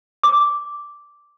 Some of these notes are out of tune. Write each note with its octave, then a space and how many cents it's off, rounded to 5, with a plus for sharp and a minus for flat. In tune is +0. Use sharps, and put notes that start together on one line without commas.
D6 -5